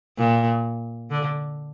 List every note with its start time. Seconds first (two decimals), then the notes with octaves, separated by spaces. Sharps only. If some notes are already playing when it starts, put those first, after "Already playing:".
0.18 A#2
1.10 D3